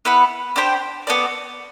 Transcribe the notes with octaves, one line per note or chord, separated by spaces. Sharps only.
B3 E4 B4 F#5
D4 G4 C5 G5
B3 F#4 A4 D5